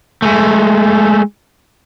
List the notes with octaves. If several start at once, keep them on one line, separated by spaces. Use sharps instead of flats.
G#3 A3